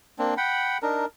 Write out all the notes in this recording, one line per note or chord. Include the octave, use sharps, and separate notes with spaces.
A#3 C4 D4
F#5 G5 B5
D4 D#4 A#4